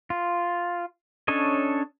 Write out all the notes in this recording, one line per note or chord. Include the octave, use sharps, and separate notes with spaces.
F4
C#4 D4 A4 C#5 D#5